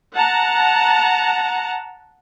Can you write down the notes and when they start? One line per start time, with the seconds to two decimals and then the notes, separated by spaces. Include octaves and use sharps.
0.14 F#5 A5 A#5